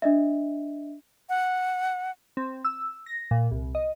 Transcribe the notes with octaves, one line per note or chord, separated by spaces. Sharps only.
D4 D#5 E5
F#5
C4
E6
A#6
A#2
C2
D#5